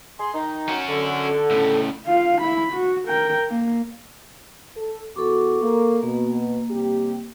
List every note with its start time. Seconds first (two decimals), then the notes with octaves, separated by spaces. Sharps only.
0.19 G#4 C6
0.33 D#3 D#4
0.69 C#4 F#4
0.88 D3
1.26 A4
1.51 A2 C#3
2.06 F4 F5
2.41 E4 B5
2.73 F#4
3.08 A#4 G5
3.49 A#3
4.75 A4
5.16 E2 F#4 A4 C#6 D6
5.61 A#3
6.03 B2 A#3
6.70 C3 G3 G4